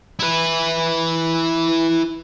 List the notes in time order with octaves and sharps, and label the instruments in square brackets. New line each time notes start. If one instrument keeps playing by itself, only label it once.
[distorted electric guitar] E4 B4